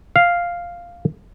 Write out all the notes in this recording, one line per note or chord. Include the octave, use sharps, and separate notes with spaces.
F5